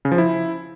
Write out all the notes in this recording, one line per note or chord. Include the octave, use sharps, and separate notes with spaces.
C#3
F3
E4